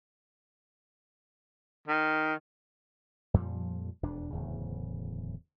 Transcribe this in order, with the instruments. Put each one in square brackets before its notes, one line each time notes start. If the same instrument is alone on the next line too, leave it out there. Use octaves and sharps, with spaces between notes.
[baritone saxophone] D#3
[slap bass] F2 A#2 F3 G3
E1 F2 D4
D1 E2 C#3